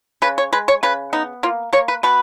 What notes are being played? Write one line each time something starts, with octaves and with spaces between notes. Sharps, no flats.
C#3 B4
C#5
G#3 B4
C#5
C#3 B4
B3 D#4
A#3 F4
A#3 C#5
B4
B2 B4